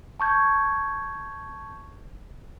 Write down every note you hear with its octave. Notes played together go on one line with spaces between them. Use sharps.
A5 C#6 G6 G#6